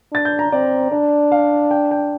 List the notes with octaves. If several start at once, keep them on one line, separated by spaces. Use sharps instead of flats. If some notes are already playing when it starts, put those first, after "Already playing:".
D4 A6
G6
A#5
C4 D5
D4 D5
F5
G5
G5